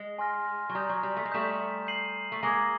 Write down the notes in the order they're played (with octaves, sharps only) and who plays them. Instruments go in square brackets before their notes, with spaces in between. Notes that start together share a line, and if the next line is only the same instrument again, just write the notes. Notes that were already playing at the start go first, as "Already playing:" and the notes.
Already playing: [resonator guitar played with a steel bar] G#3
[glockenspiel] G#5 C6 F6 A#6
[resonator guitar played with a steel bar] F#3
[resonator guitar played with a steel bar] G3 [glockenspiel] A#5 D#6 G6
[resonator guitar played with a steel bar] F#3
G3
A3
G#3
[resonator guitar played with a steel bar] G3 A3 [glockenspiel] D#6 G6 B6 E7
[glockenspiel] G6 C7 D#7 F#7
[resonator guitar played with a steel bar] A3
[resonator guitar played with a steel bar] G#3 A#3 [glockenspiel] A#5 D#6 G#6